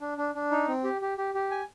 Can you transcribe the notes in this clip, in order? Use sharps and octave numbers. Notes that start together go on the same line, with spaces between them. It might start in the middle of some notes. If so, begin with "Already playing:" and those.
D4
D4
D4
D#4
C4
G4
G4
G4
G4
G#5